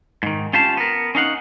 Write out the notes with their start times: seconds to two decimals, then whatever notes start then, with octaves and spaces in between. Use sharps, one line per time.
0.23 G#2 D#3
0.53 C#4 F4 G4 F5 A5
0.77 B3 A#4
1.15 C#4 D#4 F5 F#5